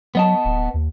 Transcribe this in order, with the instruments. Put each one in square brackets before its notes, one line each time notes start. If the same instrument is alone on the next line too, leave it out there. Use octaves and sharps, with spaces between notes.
[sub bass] F#3 [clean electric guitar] B3 D#5 A5
[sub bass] D1
D#2